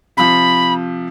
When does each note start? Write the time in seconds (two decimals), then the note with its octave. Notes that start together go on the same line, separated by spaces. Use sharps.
0.17 C3 F3 B5